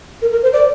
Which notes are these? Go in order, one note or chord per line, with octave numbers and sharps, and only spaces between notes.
A#4
A#4
C5
D5